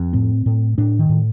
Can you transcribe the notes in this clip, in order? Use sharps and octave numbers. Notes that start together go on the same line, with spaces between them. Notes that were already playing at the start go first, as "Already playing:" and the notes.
Already playing: F2
A2 C4
A2
A2 D4
D#3
A2